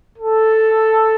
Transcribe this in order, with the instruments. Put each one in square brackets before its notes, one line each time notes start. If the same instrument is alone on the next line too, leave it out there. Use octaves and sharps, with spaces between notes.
[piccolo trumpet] A4